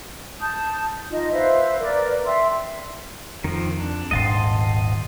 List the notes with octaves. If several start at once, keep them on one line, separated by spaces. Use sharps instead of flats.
A5 D#6 G6
D#4 F4 D#5
B4 C5 E5 F5
A#4 B4 D5
E5 G5 C6 E6
F2 D#3 F3
D4
D#1 G#1 G#2 D#5 A5 C6